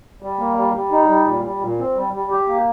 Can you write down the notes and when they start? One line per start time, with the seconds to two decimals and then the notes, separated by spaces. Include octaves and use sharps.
0.22 G3
0.39 A#3
0.57 G3
0.74 G3
0.92 D#4
1.09 G3
1.26 A#2
1.44 G3
1.61 A#2
1.79 C4
1.96 G3
2.13 G3
2.31 G4
2.48 A#3